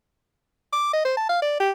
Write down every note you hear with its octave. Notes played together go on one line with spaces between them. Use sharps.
D6
D#5
C5
A5
F5
D5
G4